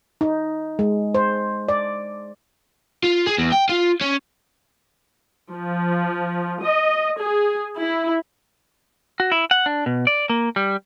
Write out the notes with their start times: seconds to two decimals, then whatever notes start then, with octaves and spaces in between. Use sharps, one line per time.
0.21 D#4
0.79 G#3
1.15 C5
1.68 D5
3.03 F4
3.26 G#4
3.38 E2
3.52 G5
3.69 F4
4.02 C#4
5.51 F3
6.64 D#5
7.20 G#4
7.78 E4
9.20 F#4
9.32 E4
9.51 F#5
9.66 D4
9.86 B2
10.07 D5
10.30 A#3
10.56 G3